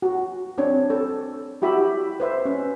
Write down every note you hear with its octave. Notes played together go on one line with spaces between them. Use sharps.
F#4
C4 D4 C#5
A4
E4 F#4 G4 E5 B5
B4 C5 E5
C#4